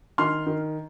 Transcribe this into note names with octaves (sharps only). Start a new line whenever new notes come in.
D#3 C6 F6
D#3